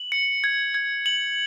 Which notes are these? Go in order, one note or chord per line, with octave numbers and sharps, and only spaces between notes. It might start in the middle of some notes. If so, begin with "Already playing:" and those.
Already playing: F#7
C#7
G#6
G#6
F#7